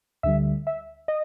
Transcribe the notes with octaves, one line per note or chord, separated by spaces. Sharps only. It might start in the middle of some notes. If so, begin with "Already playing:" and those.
D2 D3 G3 E5
E5
D#5